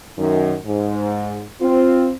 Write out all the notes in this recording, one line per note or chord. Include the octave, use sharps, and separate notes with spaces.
F#2 D#3
G#2
C4 F4